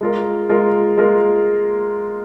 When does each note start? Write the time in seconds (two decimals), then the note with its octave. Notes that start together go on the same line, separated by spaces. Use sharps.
0.01 G#3 F4 A#4
0.49 G#3 F4 A#4
0.97 G#3 F4 A#4